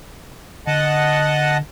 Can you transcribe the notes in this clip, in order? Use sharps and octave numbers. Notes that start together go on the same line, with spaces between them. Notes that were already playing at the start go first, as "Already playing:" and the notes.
D3 D#5 F#5 A5